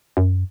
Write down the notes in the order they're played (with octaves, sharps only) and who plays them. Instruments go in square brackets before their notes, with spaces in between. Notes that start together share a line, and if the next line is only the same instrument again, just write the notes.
[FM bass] F#2